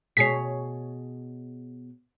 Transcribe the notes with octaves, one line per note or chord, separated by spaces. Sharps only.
B2 G#4 C#5 B6 C7